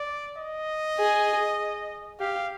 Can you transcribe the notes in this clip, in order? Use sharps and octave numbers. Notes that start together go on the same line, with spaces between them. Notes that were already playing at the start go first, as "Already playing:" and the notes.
Already playing: D5
D#5
G#4
G4 F5